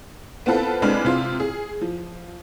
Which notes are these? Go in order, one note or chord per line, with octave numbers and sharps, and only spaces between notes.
B3 C4 F4 A4 B4
C2 G#3 C4 D4 B4 F6
C3 F4 C6
G#4
F3